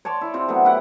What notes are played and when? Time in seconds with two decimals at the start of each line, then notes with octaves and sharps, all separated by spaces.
0.05 C#5 D5 A5 C6
0.21 E4
0.34 C3 C4 F4
0.48 F#3 A3 B3
0.65 E4 G4 F#5